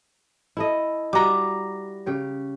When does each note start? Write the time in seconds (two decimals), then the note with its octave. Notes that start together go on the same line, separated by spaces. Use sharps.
0.57 E4 A4 D#5
1.13 G3 F#4 E5 A#5 D6
2.06 C#3 G4 C#5